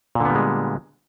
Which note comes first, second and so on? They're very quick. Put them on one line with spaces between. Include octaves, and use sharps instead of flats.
A#2 D3 B3 G3 G#3